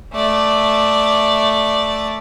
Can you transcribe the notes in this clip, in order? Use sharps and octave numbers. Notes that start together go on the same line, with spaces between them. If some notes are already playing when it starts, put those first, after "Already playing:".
A3 D5